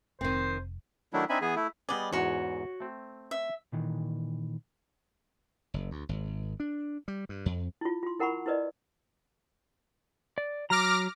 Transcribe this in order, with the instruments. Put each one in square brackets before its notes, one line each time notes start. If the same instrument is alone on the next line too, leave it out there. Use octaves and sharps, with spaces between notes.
[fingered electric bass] F1 [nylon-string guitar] D#3 C4 [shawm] C5
[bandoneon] D#3 F#3 A3 D4 E4
C4 D4 D#4 E5 G#5 B5
E3 B3 G#4 G#5
A3 E4
[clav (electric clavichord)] G3 B3 G#4 [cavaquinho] D5 D#5
[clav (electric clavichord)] E2 G#2 [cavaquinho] F#4 C#5
[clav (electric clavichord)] A3 C4
[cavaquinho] E5
[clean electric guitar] A#2 D#3 E3
[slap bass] F#1
D2
G#1
D4
G3
G2
F2
[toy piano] E4 F4
F4 C6
E4 A#4 F#5 A#5 B5 C#6
E4 A#4 B4 D5 D#5
[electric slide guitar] D5
[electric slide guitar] F#3 A#5 [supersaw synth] D6 F6 A#6